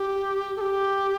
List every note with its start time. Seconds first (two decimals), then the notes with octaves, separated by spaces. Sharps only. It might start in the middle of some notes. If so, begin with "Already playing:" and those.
Already playing: G4
0.56 A4
0.61 G4